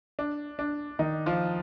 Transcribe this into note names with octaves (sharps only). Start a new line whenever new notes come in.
D4
D4
D#3 D#4
F3 F4